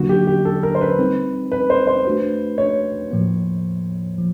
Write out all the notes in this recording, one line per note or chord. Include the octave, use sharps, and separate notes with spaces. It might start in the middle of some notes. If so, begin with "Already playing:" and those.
Already playing: D3 F#3 A#3 D4 F#4
G4
G4
A4
A#4
C5
B4
G3 C4 D#4
B4
C5
C5
A3 D4 F#4 B4
C#5
A2 F3 A#3
F3